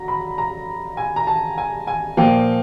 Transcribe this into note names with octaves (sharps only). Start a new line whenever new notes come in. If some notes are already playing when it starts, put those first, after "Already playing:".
Already playing: F#3 A#5
B5
A#5
G#5
A#5
A5
G#5
G#5
A#2 F3 A#3 G5